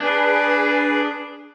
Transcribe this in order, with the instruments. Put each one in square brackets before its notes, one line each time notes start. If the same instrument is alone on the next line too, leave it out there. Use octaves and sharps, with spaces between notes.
[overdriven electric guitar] D4 [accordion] G#4 B4